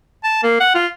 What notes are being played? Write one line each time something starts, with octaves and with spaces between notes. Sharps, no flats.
A5
A#3
F#5
F4